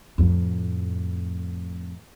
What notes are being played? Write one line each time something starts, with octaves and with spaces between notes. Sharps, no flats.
F2 A2